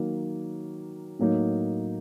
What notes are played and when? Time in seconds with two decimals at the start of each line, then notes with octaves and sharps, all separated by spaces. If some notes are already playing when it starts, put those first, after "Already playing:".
Already playing: D#3 F#3 A#3
1.19 A2 F#3 A#3 D#4